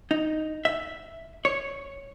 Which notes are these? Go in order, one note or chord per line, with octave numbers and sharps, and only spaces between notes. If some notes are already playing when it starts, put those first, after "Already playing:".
D#4
E5
C#5